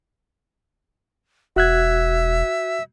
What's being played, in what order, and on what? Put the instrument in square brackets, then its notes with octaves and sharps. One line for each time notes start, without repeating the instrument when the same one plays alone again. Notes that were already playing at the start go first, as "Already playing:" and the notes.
[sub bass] E1 [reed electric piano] F#4 F#6 G#6 [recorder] E5